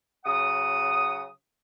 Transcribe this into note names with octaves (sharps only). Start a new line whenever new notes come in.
C#3 F#3 F#5 D#6